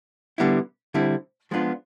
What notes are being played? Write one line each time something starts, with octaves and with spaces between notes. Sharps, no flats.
D3 G3 B3 E4
D3 G3 C4 E4
F3 G#3 B3 D4 F4